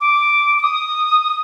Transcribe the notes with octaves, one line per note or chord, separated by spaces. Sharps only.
D6
D6
D#6